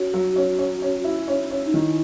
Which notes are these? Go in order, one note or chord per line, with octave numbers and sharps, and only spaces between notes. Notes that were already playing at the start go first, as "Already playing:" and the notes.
Already playing: C#4 F#4
F#3
C#4
C#4
C#4
E4
C#4
C#4
D#4
D#3 E4